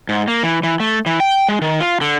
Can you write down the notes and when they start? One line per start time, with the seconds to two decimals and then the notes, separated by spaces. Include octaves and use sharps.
0.09 G#2
0.28 A#3
0.43 E3
0.63 E3
0.80 A3
1.06 E3
1.20 G5
1.49 G#3
1.62 D#3
1.80 F4
2.01 D3